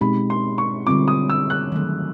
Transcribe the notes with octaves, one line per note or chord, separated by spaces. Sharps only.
B2 G#3 C4 D#4 G4 B5
C6
C#6
D3 G3 C4 F4 D6
D#6
E6
F#6
D#3 F#3 A3